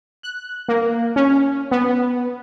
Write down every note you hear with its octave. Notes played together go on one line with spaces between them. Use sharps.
F#6
A#3
C#4
B3